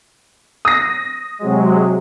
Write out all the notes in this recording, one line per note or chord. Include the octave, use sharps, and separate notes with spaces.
D#6 A#6
C3 F#3 G#3